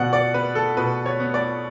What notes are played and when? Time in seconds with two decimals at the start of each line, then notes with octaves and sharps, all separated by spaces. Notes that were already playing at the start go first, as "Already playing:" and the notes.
Already playing: B2 B3 D5 F#5
0.13 D5
0.34 B3 B4
0.55 A4
0.77 B2 B4
1.06 C#5
1.20 B3
1.34 D5